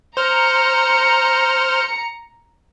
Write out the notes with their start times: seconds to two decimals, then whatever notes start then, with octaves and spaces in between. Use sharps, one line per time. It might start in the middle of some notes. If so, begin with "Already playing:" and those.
0.17 C5 A#5 F6 C#7